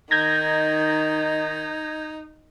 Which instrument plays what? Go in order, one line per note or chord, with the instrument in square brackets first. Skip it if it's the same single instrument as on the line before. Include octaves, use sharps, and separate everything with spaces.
[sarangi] D#3 [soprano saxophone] D#4 [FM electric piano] G6 G#6 A#6